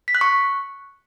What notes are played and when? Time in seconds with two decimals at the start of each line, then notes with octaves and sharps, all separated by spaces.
0.08 B6
0.15 F#6
0.21 C#6